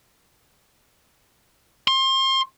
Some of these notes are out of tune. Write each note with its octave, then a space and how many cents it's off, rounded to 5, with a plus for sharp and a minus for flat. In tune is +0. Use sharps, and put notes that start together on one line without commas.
C6 +30